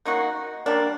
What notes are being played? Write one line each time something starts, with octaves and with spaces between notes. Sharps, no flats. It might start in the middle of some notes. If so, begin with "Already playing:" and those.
A#3 D#4 F#4
G3 A#3 D4